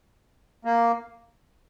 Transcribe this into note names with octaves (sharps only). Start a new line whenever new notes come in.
A#3